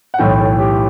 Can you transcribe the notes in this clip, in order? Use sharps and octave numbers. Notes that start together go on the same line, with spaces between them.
F#5
B1 A2 E3 G5
A4
G4